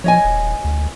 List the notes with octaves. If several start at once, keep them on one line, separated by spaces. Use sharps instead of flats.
F3 C#5 D#5 G#5
D#1
D2